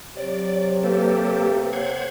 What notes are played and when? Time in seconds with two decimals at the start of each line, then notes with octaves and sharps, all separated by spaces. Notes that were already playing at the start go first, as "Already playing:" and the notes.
0.17 C3 F#3 C#5 D5
0.83 A#3 G4 A4 B4
1.73 C5 C#5 F#5 G#6